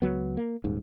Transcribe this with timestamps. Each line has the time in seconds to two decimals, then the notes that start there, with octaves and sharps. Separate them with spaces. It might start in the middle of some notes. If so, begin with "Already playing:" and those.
0.02 C#2 F#3 B3
0.37 A#3
0.64 D#1 D#2 G#2